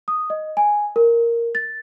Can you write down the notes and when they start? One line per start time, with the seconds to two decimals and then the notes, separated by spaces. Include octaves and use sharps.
0.08 D#6
0.30 D#5
0.57 G#5
0.96 A#4
1.55 A6